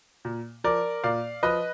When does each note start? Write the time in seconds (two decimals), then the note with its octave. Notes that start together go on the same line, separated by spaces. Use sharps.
0.25 A#2
0.64 F3 A#4 D5
1.04 A#2 D5 F5
1.43 F3 B4 D#5